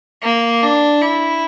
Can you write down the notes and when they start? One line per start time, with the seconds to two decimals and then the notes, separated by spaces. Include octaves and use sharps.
0.23 A#3
0.63 D4
1.02 E4